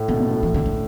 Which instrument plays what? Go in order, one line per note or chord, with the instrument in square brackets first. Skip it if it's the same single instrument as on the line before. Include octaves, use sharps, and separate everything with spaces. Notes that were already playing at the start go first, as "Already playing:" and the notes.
Already playing: [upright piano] A2
[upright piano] B2 [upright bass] D3
[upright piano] B2
A2
[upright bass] E3
D3
D3